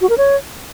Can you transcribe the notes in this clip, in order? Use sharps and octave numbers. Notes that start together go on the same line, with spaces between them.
F#4
A#4
C#5